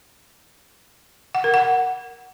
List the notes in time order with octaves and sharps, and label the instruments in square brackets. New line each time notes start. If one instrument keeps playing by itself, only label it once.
[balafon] F#5
A#4
F#5